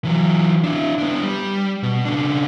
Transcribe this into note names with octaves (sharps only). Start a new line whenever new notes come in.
E3 F#3
D4 E4
B3 D4
G3
B2
C#3 D4